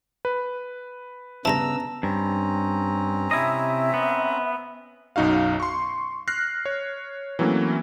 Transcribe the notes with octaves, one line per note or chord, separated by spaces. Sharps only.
B4
G2 C#3 E3 B3 A5 A#5 E6 A#6
G2 C4 C#4 A#5
C3 E4 D#5 E5
B3
B1 F#2 D#4 F#4 F5
C6 C#6
F6 F#6 A#6 C7
C#5
E3 F#3 A3 A#3 C4 C#4